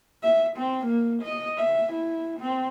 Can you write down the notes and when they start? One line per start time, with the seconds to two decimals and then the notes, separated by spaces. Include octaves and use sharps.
0.22 E5
0.56 C4
0.85 A#3
1.22 D#5
1.57 E5
1.92 E4
2.39 C4